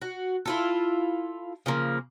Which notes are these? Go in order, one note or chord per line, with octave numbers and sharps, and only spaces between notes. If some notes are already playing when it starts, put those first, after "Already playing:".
F#4
E4 F4 A4
C#3 F3 A#3